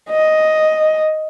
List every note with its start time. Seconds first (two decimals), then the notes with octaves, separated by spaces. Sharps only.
0.10 D#5